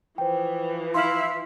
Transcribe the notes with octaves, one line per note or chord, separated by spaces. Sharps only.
E3 F3 C5 G5
E4 E5 F5 C6 E6 F6